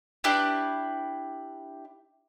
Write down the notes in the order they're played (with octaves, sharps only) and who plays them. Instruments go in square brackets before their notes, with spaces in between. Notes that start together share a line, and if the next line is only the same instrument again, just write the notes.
[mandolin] D4 E4 G4 B4